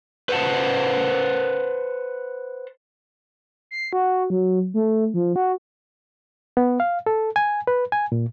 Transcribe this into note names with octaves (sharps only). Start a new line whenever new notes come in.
B4 C5 F#5 A5
C7
F#4
F#3
A3
F3
F#4
B3
F5
A4
G#5
B4
G#5
A#2